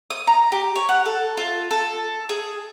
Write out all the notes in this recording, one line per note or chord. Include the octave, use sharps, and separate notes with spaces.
D#6
A#5
G4
C#5
F#5
A4
F4
A4
G#4